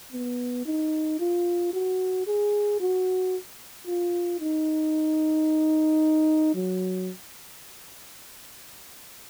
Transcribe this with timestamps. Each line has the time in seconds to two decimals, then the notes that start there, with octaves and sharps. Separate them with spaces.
0.12 B3
0.66 D#4
1.19 F4
1.73 F#4
2.26 G#4
2.80 F#4
3.87 F4
4.40 D#4
6.55 F#3